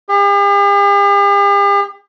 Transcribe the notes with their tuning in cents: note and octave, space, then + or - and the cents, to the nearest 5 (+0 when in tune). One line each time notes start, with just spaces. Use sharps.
G4 +45